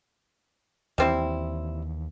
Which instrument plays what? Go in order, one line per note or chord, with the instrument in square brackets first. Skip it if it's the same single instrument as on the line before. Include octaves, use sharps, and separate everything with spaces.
[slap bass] D#2 E3 [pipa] G3 C4 E4